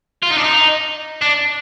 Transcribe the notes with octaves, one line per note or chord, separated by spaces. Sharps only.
F4
D#4
D4
D#4
D4